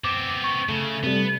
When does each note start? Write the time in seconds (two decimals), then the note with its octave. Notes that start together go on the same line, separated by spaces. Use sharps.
0.04 B3 C4 D6
0.44 C#6
0.69 C#3 A3
1.03 C3 G3 B3